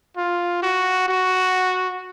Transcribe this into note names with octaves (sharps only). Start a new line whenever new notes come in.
F4
F#4
F#4